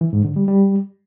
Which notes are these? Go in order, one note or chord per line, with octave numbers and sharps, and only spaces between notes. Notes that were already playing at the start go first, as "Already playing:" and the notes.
E3
G#2
D3
G3
G3